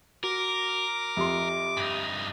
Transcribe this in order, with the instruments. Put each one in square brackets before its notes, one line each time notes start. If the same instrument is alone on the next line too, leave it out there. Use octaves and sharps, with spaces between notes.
[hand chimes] F#4 [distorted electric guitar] A#4 [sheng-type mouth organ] D6
[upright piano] F2 C6 [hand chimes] G4 E5
[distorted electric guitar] G2 D#4